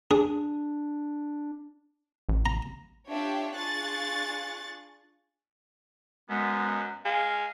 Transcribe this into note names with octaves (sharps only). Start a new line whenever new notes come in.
D4 G#4
A1
A#5
D4 F4 G4 C#5 E5 G5
D4 F4 G#4 C#6 F#6 A6
F#2 G#3 B3
G#3 F5